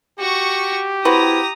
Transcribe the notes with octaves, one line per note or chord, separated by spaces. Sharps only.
F#4 G4 C#6
C4 E4 F#4 B4 A#5 D#6